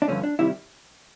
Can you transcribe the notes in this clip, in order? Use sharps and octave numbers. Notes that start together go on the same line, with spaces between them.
D4
G2 D3 F3 A3 C#4
D4
C3 D#3 G3 E4